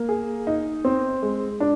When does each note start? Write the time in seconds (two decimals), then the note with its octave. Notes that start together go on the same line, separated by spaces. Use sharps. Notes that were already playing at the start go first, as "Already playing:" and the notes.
Already playing: A#3
0.09 G#4
0.47 D#4
0.85 C4
1.22 G#3
1.60 D4